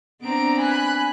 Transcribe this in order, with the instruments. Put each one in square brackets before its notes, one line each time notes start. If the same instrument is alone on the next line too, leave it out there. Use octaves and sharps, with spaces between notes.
[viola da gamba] B3 C4 D4 [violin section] A#5 D7
[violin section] G#5 B5 F#6